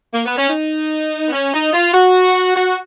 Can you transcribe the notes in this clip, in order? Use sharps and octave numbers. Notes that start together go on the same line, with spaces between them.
A#3
B3
C#4
D#4
B3
C#4
D#4
F4
F#4
F#4